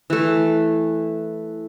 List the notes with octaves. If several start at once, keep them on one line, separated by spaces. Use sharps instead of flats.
E3 A3